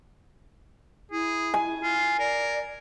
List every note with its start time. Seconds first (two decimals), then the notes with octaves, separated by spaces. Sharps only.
1.12 E4 G#4
1.54 G#5
1.83 F4
2.19 A#4 D5